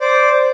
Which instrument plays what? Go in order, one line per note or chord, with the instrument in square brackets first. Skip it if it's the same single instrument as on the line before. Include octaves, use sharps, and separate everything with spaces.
[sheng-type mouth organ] C5 D5